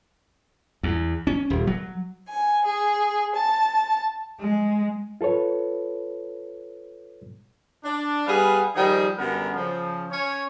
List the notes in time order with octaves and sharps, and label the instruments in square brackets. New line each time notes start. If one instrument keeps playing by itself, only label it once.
[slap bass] E2
C#4
D#1
F#3
[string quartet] G#5
G#4
A5
G#3
[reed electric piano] F4 A4 B4 C#5
[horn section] D4
G3 B3 G#4 B4 F5
D#3 F3 G3 D#4 G#4
F#2 D3 G3 B3 A#4
C#3 F3
C#4 C#5